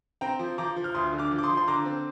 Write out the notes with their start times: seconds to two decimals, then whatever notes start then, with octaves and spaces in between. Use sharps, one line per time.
0.21 C4 G5 A#5
0.39 F3
0.58 F3 A#5 D6
0.76 F3
0.84 F6
0.94 D2 C6 D#6
1.13 D3
1.18 D6 F6
1.31 F3
1.38 D6
1.43 C6 D#6
1.49 F3
1.57 C6
1.67 D3 A#5 D6
1.85 C4